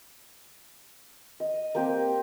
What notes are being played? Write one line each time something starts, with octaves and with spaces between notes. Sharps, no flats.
D#5
A#3 C4 G4